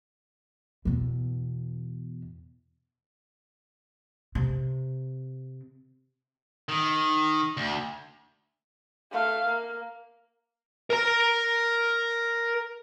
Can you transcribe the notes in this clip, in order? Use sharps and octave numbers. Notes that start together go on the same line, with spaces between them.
E2 B2
C3
D#3
D2
A3 F5
A#3
A#4 A#5